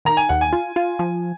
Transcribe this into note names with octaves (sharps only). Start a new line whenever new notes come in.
D#3 A#5
G#5
D#2 F#5
G#5
F4
F4
F3